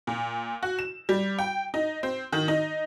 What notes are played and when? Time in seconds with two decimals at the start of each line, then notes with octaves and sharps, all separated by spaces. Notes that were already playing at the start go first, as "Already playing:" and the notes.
0.07 A#2
0.63 F#4
0.79 E7
1.09 G3
1.39 G5
1.74 D#4
2.03 C4
2.33 D#3
2.48 D#4